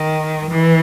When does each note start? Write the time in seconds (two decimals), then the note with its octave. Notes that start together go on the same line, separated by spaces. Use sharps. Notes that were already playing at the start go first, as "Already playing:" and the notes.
Already playing: D#3
0.50 E3